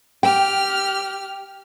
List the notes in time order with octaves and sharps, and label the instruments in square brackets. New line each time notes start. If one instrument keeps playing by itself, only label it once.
[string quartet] G4 F6 [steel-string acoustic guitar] G5